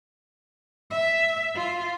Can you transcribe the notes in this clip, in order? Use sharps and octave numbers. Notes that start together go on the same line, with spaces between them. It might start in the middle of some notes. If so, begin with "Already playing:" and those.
E5
F4